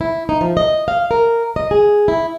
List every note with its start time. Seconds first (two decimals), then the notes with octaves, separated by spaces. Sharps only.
0.01 E4
0.29 D#4
0.41 F3
0.57 D#5
0.88 F5
1.11 A#4
1.56 D#5
1.71 G#4
2.08 E4